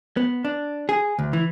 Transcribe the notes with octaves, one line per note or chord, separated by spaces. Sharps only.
B3
D4
G#4
D2
E3